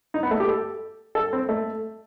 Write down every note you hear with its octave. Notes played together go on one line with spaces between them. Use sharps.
D#4
B3
A3
G4
A4
A4
C4
A3